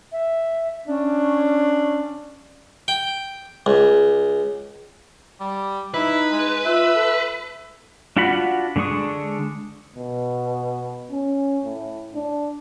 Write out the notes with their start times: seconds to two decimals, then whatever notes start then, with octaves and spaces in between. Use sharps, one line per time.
0.12 E5
0.88 C#4 D4
2.88 G5
3.66 C#2
5.40 G3
5.94 D#4 E4 B4
6.30 G#3
6.65 F4 E5
6.95 A4
8.17 D4 F4 F#4 F#5 B5
8.76 D3 G#3 D4 C#6 D#6
9.96 B2
11.11 C#4
11.65 A2
12.15 D4